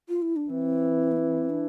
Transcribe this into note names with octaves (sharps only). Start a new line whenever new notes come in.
F4
E4
D4
E3 C4
B3
C4
D4